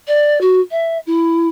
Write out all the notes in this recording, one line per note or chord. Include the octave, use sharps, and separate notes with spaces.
D5
F#4
E5
E4